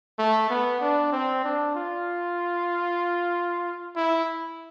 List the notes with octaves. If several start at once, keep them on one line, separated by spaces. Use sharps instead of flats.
A3
B3
D4
C4
D4
F4
E4